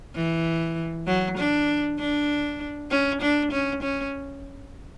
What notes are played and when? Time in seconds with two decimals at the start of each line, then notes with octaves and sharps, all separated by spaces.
0.15 E3
1.07 F#3
1.37 D4
1.99 D4
2.91 C#4
3.22 D4
3.51 C#4
3.83 C#4